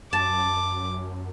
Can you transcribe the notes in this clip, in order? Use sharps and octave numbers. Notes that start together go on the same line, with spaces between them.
F#2 A5 D6